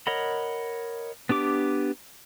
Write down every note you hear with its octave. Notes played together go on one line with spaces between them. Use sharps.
A#4 C#5 D#5 F#5 B5
B3 D4 G4 D6